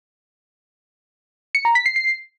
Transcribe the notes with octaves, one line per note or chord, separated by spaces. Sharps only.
C#7
A#5
B6
C7
C7